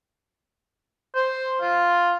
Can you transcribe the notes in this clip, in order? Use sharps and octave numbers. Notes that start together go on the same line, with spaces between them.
C5
F4